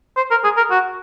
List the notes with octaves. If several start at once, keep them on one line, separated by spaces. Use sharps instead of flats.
C5
A#4
G#4
A#4
F#4